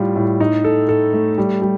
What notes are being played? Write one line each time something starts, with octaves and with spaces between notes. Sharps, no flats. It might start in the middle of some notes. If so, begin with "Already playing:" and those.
Already playing: A2 G3 F4
A2
D#4
A4
A4
A3
G3
G3